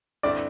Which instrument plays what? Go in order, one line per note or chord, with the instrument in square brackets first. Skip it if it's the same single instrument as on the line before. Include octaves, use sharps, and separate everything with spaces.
[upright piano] G2 D3 C4 E4 [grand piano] D5